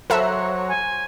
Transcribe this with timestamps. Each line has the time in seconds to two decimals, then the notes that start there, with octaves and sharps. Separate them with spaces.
0.10 F#3 A4 C5 C#5 E5 A#5 F#6
0.68 G#5